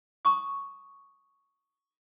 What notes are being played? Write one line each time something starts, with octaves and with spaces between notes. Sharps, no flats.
A#5 C#6 D#6